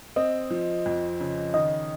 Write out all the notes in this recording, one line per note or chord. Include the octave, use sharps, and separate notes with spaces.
C4 D#5
F3
F2
C#3
D#3 D#5